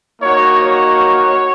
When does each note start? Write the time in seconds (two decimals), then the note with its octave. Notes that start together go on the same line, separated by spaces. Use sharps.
0.20 A#3 D#4 F#4 C#5
0.63 C#5